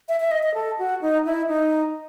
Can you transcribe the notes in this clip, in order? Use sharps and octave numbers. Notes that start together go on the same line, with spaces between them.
E5
E5
D#5
D#5
A4
F#4
D#4
E4
D#4